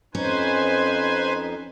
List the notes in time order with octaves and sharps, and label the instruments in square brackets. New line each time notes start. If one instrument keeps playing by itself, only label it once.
[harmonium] F2 D#4 [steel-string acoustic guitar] C#4 [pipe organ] B4 C5 G#5